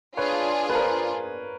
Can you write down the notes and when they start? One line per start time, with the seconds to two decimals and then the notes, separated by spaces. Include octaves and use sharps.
0.17 D4 F4 G#4 B4 C#5
0.70 B4
0.75 A#4 C5